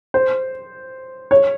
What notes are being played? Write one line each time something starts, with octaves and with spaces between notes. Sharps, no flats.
C5
C#5